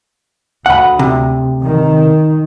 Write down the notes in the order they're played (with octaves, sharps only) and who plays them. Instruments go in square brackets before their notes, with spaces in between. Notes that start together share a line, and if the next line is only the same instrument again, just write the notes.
[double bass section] D2 [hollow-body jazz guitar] F#5 B5
[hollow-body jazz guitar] C3
[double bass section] D#3